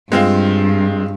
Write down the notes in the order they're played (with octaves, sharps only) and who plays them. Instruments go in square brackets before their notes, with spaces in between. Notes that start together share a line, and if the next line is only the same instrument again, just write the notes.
[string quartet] G2 [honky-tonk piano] G#3 C4 F4